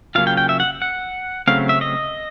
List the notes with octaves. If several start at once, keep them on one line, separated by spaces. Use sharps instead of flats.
C#3 F#3 A#3 C#4 F4 F5
G5
G5
E5
F#5
F#5
C#3 F#3 A3 C4 F5
E5
D#5